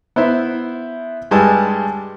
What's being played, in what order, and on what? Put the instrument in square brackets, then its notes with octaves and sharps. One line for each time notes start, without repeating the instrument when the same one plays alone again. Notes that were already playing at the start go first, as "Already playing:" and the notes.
[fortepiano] B3 E4 C5 E5
G2 G3 G#3 G#5 A5 E6